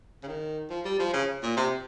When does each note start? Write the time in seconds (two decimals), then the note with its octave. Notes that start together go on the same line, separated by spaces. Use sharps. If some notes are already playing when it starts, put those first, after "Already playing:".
0.23 C#3
0.28 D#3
0.70 F3
0.85 G3
0.99 F3
1.14 C#3
1.43 A#2
1.57 C3